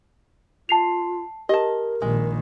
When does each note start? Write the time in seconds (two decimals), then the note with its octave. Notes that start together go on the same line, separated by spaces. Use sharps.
0.69 F4 A5 C7 F7
1.49 G4 A#4 D#5 A5
2.02 A#1 D#3 G#3